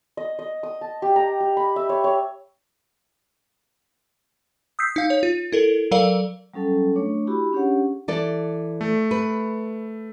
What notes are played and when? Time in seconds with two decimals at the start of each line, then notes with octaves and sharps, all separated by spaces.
0.17 D#5
0.39 D#5
0.63 D#6
0.81 A5
1.02 G4
1.16 A#5
1.40 G4
1.57 B5
1.76 E5
1.89 C#5
2.04 C#5
4.79 D#6 E6 G6 B6 C7
4.96 D#4 F5
5.10 C#5
5.23 F4
5.52 E4 A4 A#4
5.91 F#3 A4 A#4 D5 F5
6.53 F#3 G3 C#4 A4 A5
6.95 A3 D4 C#5 C#6 D6
7.27 E4 F#4 G4 B5
7.53 C#4 D4 G4 G#4 C#5 F#5
8.08 E3 A4 D5
8.81 A3
9.11 B4